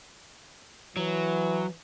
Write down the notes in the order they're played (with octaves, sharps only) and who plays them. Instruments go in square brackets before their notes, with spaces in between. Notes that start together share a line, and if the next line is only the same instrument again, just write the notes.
[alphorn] E3 [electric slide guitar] F#3